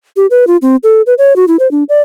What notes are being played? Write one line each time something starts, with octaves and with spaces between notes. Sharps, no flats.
G4
B4
F4
C4
A4
B4
C#5
F#4
E4
C5
D4
D5